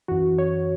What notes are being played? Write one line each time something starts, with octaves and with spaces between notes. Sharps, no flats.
F#2 E3 F#4
C#5